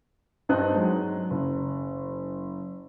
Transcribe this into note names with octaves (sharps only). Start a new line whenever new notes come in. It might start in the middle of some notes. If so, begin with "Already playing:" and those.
G2 C4 D#4 D#5 A5 F#6
F#3 G#3
F#1